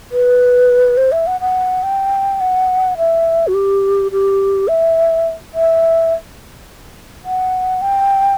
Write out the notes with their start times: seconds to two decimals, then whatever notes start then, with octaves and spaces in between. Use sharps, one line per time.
0.12 B4
0.97 C5
1.12 E5
1.27 F#5
1.41 F#5
1.83 G5
2.40 F#5
2.98 E5
3.47 F#4
3.54 G4
4.12 G4
4.68 E5
5.54 E5
7.25 F#5
7.82 G5